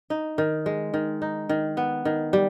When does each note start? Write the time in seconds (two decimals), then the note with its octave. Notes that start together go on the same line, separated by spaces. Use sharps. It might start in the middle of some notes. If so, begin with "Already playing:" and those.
0.10 D#4
0.38 D#3
0.66 G#3
0.94 D#3
1.22 D#4
1.49 D#3
1.77 B3
2.05 D#3
2.33 G3